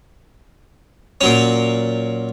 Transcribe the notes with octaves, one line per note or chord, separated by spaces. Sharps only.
A#2 F#3 C#4